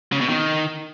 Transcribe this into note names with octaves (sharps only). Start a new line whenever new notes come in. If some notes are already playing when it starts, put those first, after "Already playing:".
C#3
B2
D#3